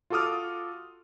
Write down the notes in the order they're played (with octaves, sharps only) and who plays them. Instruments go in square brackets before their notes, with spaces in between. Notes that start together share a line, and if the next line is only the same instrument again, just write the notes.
[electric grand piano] F4 F#4 A4 D6 D#6 F6